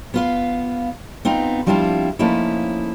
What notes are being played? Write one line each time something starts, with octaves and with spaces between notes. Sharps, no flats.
B3 F4 F5
B3 C4 D#4 F4
F3 G3 C4 D4 E4 F4
F3 A3 A#3 C#4 D#4 E4